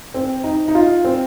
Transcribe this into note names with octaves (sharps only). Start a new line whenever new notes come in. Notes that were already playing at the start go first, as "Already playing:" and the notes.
C4
D#4
D#4
F4
C4